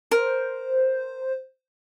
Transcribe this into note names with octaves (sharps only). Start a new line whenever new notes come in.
A#4 C5